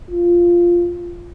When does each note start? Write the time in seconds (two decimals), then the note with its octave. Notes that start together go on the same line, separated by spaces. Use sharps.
0.10 F4